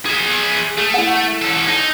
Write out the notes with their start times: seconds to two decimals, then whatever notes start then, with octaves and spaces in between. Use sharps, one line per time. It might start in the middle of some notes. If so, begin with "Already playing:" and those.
0.06 G#4 E5
0.78 A3 G#4
0.94 E4 F#5
1.42 C#4 A4
1.68 D#4